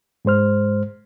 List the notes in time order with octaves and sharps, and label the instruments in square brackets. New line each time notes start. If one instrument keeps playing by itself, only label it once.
[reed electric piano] G#2 G#3 C5 F6